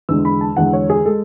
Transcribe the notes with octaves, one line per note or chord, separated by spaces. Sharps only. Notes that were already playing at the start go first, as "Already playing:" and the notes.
E2 D3 G#3 E6
B5
A5
E2 D3 G#3 F#5
C#5
G#4
G#3 A4